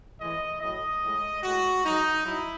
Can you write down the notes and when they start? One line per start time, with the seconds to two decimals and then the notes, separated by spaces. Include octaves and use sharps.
0.19 A2 E3 G#3 D#5
0.61 A2 F#3 D#5
1.02 A2 G#3
1.43 A2 G#3 F#4
1.85 G#2 F#3 D#4
2.26 F#3 E4